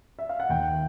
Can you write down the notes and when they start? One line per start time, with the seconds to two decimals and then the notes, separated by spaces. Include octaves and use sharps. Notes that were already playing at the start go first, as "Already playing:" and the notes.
0.19 E5
0.29 F5
0.40 F#5
0.49 D#2 G5